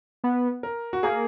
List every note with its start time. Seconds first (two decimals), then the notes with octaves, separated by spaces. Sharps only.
0.24 B3
0.63 A#4
0.93 F#4
1.03 A#3 G#4